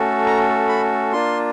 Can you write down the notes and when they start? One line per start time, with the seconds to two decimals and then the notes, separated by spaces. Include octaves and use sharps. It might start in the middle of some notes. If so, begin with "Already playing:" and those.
Already playing: A3 C#4 F#4 A4
0.26 A#5
0.69 B5
1.13 A#3 D4 F4 C6